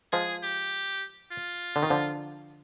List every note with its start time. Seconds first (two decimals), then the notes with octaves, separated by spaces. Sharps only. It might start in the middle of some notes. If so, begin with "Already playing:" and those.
0.13 F3 G#3 G#4
0.43 G4
1.32 F4
1.76 D3
1.83 D#3
1.90 D3 F3